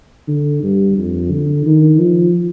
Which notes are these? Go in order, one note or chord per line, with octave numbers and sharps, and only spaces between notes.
D3
G2
F2
D3
D#3
F3